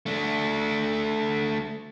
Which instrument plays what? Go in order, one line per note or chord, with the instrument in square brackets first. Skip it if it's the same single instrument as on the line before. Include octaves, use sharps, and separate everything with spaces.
[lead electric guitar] A3 D4